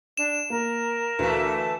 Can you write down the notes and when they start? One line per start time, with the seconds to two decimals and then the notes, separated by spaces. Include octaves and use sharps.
0.17 D4 E7
0.50 A#3 A#4
1.19 D2 E3 A3 F5